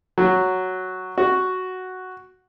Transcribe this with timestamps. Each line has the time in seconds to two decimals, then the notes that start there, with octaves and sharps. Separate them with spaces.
0.18 F#3
1.18 F#4